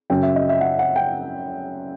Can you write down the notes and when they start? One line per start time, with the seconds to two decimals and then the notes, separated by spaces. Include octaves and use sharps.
0.10 F#2 C#3 F#3 G5
0.23 E5
0.36 D#5
0.49 E5
0.61 F#5
0.79 F#5
0.96 G5